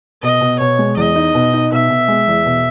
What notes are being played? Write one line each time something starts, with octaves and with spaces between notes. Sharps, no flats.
B2 D#5
B2
B2 C#5
G#3
E2 D#5
D#4
B2
D#4
B2 E5
B2
G#3
E2
B2